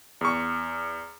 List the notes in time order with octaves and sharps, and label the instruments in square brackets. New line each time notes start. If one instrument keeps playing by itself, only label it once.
[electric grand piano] E2 C#6